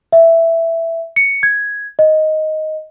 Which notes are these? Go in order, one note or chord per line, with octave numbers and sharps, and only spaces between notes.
E5
C#7
G#6
D#5